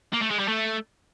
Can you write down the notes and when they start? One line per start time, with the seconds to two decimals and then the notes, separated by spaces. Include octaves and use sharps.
0.13 A#3
0.22 A3
0.30 G#3
0.39 G3
0.48 A3